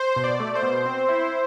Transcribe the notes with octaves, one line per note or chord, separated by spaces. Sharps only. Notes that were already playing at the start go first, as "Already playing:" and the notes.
Already playing: C5
B2
D5
A3
C5
B2
C4
E4